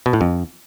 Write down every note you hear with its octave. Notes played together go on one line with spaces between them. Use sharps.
B2
A2
F2